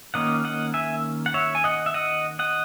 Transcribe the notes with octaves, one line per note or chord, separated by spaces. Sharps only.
D#3 A#3 C#4 D#5 F#5
D#5 F#5
E5 G#5
F#5
C#5 E5
G#5
D#5 F#5
E5
D#5 F#5
D#5 F#5